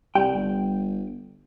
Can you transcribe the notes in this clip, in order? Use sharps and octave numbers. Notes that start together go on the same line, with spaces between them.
C2 G3 G5
G1